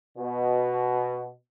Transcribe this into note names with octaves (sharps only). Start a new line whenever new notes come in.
B2